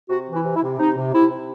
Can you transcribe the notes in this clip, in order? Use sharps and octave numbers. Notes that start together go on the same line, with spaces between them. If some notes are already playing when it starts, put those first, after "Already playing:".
C3 F#4
E3
E4
C3
E4
C3
C3 D#4
C3
C3 E4
C3